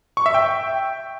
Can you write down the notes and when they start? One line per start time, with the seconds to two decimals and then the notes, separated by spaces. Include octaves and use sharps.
0.17 C#6
0.26 E5
0.34 G5